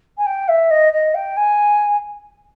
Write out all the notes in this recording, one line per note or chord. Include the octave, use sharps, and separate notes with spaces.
G#5
G5
E5
D#5
D#5
G5
G#5